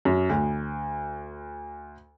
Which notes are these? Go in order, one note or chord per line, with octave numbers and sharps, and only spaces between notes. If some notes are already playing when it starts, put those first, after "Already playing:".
F#2
D2